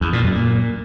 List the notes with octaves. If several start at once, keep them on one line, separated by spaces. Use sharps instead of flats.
E2
A#2
F#2
A#2